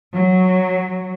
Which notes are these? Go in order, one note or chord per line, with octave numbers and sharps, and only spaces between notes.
F#3